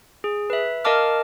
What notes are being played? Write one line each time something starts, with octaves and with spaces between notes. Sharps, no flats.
G#4
B4 E5
A#4 D#5 F5 A5 D6 F6